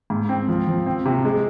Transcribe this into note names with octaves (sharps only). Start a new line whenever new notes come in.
G#2
C4
F3
F3
C4
C3
G#3